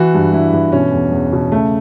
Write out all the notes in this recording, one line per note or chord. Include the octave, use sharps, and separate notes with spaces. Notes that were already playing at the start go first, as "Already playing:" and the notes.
Already playing: E3 F#4
G2
G2 E4
E3
B2 C#4
E2
E2
B2
C#3 A3